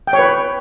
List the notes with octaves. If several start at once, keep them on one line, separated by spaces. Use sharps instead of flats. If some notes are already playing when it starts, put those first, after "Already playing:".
G5
C#5
B4